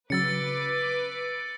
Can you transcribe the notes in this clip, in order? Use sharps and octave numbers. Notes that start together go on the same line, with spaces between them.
C#3 F#3 B4 D6 E6 A6 C#7